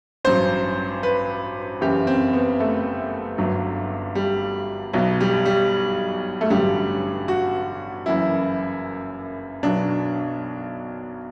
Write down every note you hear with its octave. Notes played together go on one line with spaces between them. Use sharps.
A1 G2 F#3 C5
B4
F#1 F#2 E3 G4
C4
B3
A3
G1 G2 F#3
G3
B1 B2 F#3
G3
G3
A3
A1 G2 D3 F#3 G3
F#4
F#1 F#2 E3 E4
B1 B2 F#3 D4